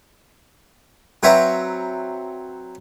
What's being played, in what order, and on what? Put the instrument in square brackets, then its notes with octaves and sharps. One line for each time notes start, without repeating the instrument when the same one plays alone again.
[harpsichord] F#3 C4 B4 C#5 E5 A#5